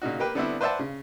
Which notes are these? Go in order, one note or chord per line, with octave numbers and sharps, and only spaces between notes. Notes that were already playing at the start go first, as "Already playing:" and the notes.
A#2 C#3 D#4 F#4
A#3 G4 B4
D3 G3 B3 C4 D4 E4
B4 C5 D5 E5 F#5 A5
C#3